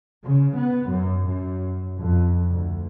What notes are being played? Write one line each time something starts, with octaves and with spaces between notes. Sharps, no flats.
C#3
B3
F#2
F#2
F2
D2